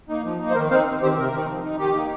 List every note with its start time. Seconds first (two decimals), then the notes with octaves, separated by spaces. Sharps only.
0.09 A#3 D#4
0.25 F3
0.41 A#3 D#4
0.50 C5
0.56 D#3 A#4
0.71 C4 D#4 C5 F5
0.87 C3
1.02 D#3 C4 G4 C5
1.17 C3 A#4
1.32 D#3 C4 D#4
1.48 F3
1.64 D#4
1.78 D#3 G4
1.95 A#3 D#4